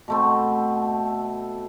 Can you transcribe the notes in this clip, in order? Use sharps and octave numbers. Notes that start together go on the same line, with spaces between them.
B2 A3 C4